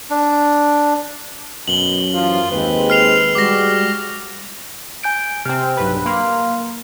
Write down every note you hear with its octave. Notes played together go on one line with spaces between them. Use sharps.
D4
F#2 B2 F#7 G7
E3 F3 F4
D#2 G#3 C4 B4
F6 C7 F7
G3 G#3 F#4 D6 A#6
G#5 G6 D7
C3 C4 F6
B1 G2 B4 B5
A#3 F5 C6 F6